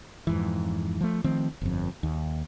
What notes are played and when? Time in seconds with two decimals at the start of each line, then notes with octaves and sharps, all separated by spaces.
0.27 F2 G#2 E3
1.01 F3 A3
1.24 D#3 F3 A3 C4
1.61 G1 F2
2.03 D#2